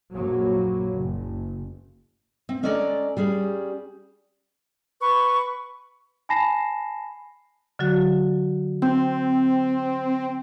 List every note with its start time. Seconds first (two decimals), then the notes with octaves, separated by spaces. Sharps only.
0.13 A#1 F#2 F#3 A#3
0.95 F#1
2.49 C4
2.63 G#3 C#4 A4 D5 D#5 A#5
3.17 G3 C#4 G#4
5.01 B4 C#6
6.29 G#5 A5 B5 A#6 C7 E7
7.79 D3 F#3 F#4
8.82 C4 G6